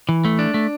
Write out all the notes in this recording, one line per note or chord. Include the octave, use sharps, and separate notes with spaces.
E3
A3
D4
A3